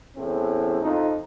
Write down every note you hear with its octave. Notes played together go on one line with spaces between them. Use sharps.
A1 E2 A2 C4
F2 D#4